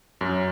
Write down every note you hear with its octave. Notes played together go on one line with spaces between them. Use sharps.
F#2